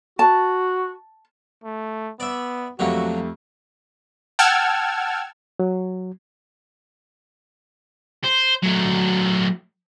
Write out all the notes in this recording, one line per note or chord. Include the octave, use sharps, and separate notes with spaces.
F#4 A5
A3
B3 D5 E5
F2 D3 F#3 A3 A#3 F#4 G4
F#5 G5 A5 E6 F6 G#6
F#3
C5
F#3 A3